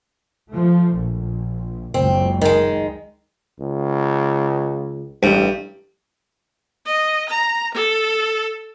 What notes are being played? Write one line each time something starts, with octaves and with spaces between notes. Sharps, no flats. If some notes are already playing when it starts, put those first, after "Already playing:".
F3 A3
A#1
F#1 C#2 C4
D#3 G#3
C#2
A1 G2
D#5
A#5
A4